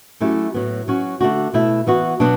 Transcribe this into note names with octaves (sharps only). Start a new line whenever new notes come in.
F#3 A3 C#4 E4 G4
A2 F#3 B3
F#3 C#4 F#4
D3 A3 D4 F#4
B2 A3 E4
E3 B3 F#4
B2 F#3 B3 D4 F#4